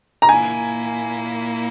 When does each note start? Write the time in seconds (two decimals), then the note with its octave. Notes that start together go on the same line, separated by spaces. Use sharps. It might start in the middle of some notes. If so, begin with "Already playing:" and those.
0.22 A#5
0.29 A#2 A#3 E4 G#5